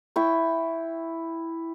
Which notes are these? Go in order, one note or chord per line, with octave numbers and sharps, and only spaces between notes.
E4 G5 C#6